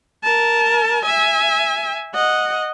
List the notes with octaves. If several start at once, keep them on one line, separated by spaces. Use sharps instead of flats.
A#4 A5
E5 G#5
D#5 F#5